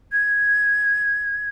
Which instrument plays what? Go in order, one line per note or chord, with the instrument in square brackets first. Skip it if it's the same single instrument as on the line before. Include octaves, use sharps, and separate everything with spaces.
[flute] G#6